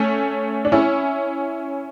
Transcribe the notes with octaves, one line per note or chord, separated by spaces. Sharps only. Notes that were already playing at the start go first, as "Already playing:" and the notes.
Already playing: A3 C#4
D4
C#4 E4